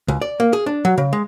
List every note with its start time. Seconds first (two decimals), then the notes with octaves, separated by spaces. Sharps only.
0.08 C#2
0.22 D5
0.40 A#3
0.53 G#4
0.66 D4
0.85 F#3
0.98 C#3
1.13 G#3